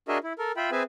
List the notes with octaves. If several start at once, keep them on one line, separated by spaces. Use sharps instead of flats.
D4 F#4 G#4 A#4 D#5 E5
E4
A4 A#4
F4 E5 G5 B5
C4 G#4 B4 E5 G#5